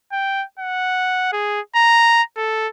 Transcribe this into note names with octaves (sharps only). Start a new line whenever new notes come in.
G5
F#5
G#4
A#5
A4